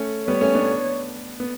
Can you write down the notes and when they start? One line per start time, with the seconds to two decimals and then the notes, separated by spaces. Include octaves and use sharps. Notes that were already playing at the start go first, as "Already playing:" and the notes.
Already playing: A3 C#4
0.28 G3 B3 C#5
0.41 A3 C#4
0.55 B3 D4
1.40 B3